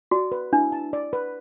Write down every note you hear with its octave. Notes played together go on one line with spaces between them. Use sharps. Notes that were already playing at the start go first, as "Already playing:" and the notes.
F#4 D5
B4
D4 E4
A5
D5
B4